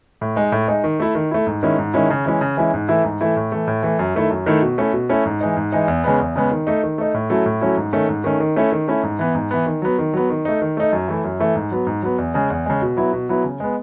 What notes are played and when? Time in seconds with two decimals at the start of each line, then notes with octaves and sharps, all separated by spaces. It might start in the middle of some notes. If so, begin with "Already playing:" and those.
0.21 A2
0.36 G#3 D#4
0.52 A2
0.68 G#3 D#4
0.84 D#3
1.00 A3 E4
1.15 D#3
1.31 A3 E4
1.47 G#2
1.63 D#3 G#3 C#4 E4
1.79 G#2
1.94 D#3 G#3 C#4 E4
2.10 C#3
2.25 E3 G#3 C#4 E4
2.41 C#3
2.57 E3 G#3 C#4 E4
2.74 G#2
2.89 E3 A3 E4
3.04 G#2
3.21 E3 A3 E4
3.36 A2
3.52 E3 A3
3.68 A2
3.83 E3 A3
3.99 F#2
4.15 D#3 A3 E4
4.30 F#2
4.46 D#3 A3 E4
4.62 B2
4.78 A3 C#4 E4
4.93 B2
5.09 A3 C#4 E4
5.26 G#2
5.41 E3 G#3 D#4
5.57 G#2
5.72 E3 G#3 D#4
5.88 E2
6.04 C#3 G#3 B3
6.20 E2
6.36 C#3 G#3 B3
6.52 D#3
6.67 A3 D#4
6.83 D#3
6.98 A3 D#4
7.14 A2
7.30 F#3 A3 C#4 E4
7.46 A2
7.61 F#3 A3 C#4 E4
7.77 G#2
7.93 D#3 A3 C#4
8.09 G#2
8.24 D#3 A3 C#4
8.40 D#3
8.56 A3 C#4 E4
8.72 D#3
8.88 A3 C#4 E4
9.03 G#2
9.19 E3 B3
9.35 G#2
9.51 E3 B3
9.66 D#3
9.82 F#3 B3
9.99 D#3
10.14 F#3 B3
10.30 D#3
10.45 A3 D#4
10.62 D#3
10.77 A3 D#4
10.93 F#2
11.08 E3 A3 E4
11.24 F#2
11.40 E3 A3 E4
11.56 G#2
11.71 F#3 B3
11.87 G#2
12.03 F#3 B3
12.18 E2
12.34 C#3 G#3
12.50 E2
12.66 C#3 G#3
12.82 B2
12.97 F#3 B3 E4
13.13 B2
13.29 F#3 B3 E4
13.44 C#3
13.60 G#3 B3